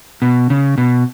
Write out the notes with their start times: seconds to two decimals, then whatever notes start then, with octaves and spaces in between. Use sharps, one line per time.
0.22 B2
0.50 C#3
0.78 B2